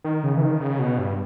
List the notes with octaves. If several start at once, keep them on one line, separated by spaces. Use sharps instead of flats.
D#3
C#3
E3
D#3
C#3
B2
G2